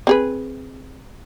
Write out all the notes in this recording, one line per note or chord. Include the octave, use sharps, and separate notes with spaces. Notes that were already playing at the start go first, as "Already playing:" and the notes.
C4 G#4 B4